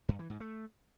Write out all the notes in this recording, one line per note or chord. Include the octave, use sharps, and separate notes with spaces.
G2
E3
G#2
A3